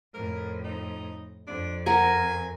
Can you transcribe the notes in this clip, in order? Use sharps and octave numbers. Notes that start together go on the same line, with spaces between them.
F2 A2 A#4
D#4
F2 D4
A#4 F#5 G#5